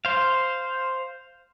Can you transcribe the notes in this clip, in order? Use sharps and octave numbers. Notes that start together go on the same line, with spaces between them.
C5 F5